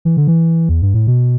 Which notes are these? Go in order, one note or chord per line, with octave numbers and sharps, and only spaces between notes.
E3
D3
E3
E2
G2
A2
B2